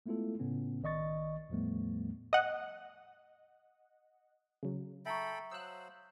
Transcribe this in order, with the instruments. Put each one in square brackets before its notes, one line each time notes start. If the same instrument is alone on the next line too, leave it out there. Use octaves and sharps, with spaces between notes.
[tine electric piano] G#3 A3 B3 E4 F4 A4
A2 C#3 B3 C#4
A#1 D#3 D5 D#5 C#6 A6
E2 A2 F3 G3 A3 B3
[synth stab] D#5 F#5
C#3 F#3
[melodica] A4 G5 B5 [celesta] E5 A#5 C#6
[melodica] F#3 C5 [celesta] F5 D#6 [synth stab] E6 F#6